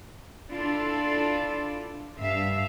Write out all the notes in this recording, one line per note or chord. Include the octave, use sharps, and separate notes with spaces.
D4 E4 F4 A4 D5
G2 E5 F5